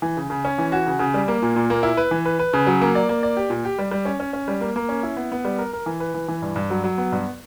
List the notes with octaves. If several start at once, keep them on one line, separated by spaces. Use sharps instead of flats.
E3
C#3
C#3
C#4
E3
F#4
C#3
C#3
G3
A#3
A#2
A#2
A#3
E4
B4
E3
B4
B4
C#3
F#3
A#3
D5
A#3
D5
G4
A#2
G4
G3
G3
C#4
C#4
C#4
G3
A#3
A#3
C#4
E4
B3
B3
G3
A#4
A#4
E3
B4
E3
E3
G2
G2
F#3
F#3
B3
G2